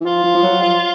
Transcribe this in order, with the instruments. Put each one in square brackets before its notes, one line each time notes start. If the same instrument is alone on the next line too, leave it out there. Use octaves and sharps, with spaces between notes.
[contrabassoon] E3
[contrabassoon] F3 [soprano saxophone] F4
[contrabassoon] F3
F3
F#3
F3